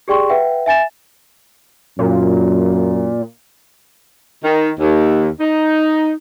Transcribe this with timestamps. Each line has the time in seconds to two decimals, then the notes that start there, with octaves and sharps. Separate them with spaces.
0.08 G4 G#4 D5 G5 C6 C#6
0.29 B4 E5 F#5 G5
0.66 E5 G#5 A6 E7
1.99 F#2 A#2
4.44 D#3
4.79 D#2
5.40 D#4